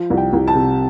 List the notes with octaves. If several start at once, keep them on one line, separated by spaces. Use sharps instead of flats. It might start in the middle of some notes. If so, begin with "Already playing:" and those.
Already playing: F3
C2
G5
C2
A5
C3